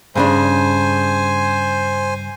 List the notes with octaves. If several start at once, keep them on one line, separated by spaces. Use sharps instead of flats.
G2 C#3 D4 C5 G#5